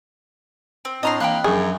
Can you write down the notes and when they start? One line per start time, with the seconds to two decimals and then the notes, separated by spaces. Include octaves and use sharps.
0.85 C4
1.03 A2 C4 D4 D#5 A5 A#5 C6
1.20 E3 A#3 G5 B5 F#6
1.44 F#2 F3 F#3 D4 G#4